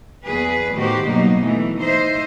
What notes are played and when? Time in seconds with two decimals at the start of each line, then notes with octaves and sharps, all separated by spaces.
0.25 E2 G#4 B4
0.75 A2 D#3 B3 F#4 G4 C5
1.06 G2 B2 F#3 A#3 D#4
1.43 E3 A3
1.80 D#4 C5 D#5 E5